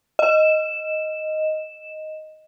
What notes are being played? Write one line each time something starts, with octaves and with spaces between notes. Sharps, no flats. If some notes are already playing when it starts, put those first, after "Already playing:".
D#5 E7